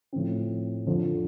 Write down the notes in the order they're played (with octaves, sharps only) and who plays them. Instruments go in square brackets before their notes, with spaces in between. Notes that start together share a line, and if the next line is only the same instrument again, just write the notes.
[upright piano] A2 F3 C4
F2 D3 F3